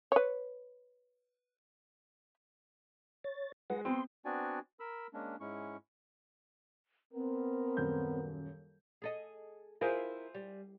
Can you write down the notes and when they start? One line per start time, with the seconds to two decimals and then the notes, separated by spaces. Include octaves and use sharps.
0.12 B4 C#5
3.24 C#5 A6
3.70 G#3 B4 F#5 A#6
3.85 B3 C4 C6
4.25 B3 C4 D4 F#4 D5 G#5
4.80 A#4 B5 E6
5.14 G#3 A#3 C#4 D4
5.40 G#2 G#3 C#4 E4 C#6
7.14 B3 C4 A#4
7.77 D#1 F#2 G6
9.02 G#4 A4 D#5
9.81 C4 E4 F4 G#4 A#4 C5
10.34 G3